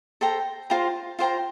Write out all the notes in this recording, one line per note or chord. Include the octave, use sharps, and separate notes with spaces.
A4 C5 G5 A#5
F4 C5 G5 A#5
F4 C5 G5 A#5